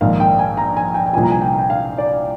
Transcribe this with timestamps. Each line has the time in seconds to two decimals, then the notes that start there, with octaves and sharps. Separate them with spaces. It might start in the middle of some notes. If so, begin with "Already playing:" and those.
0.01 A#1 G#2 D#3 F5
0.20 G5
0.39 G#5
0.57 A#5
0.77 G#5
0.94 G5
1.06 G5
1.13 C2 A#2 F3 G#5
1.23 A#5
1.32 G#5
1.41 G5
1.59 G5
1.70 F5
1.98 D5